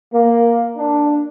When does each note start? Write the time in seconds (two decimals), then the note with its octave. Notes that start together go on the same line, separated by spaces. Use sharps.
0.13 A#3
0.77 D4